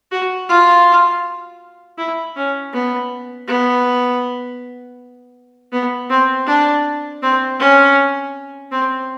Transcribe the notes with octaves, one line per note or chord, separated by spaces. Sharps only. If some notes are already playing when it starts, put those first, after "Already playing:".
F#4
F4
E4
C#4
B3
B3
B3
C4
D4
C4
C#4
C4